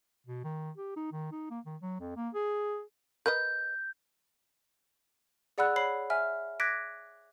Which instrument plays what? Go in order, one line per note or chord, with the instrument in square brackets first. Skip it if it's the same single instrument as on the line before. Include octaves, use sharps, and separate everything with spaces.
[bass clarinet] B2
D#3
G4
D#4
D#3
D#4
A#3
D#3
F#3
F2
A#3
G#4
[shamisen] A#4 B4 D#5 [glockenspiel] G6
[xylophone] G#4 D5 F#5 B5 E6 F#6
C#5 B5 C7
E5 G#5 F6
D6 F#6 G#6 A#6 B6 D7